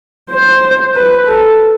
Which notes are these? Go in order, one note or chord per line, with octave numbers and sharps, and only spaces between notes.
C5
B4
A4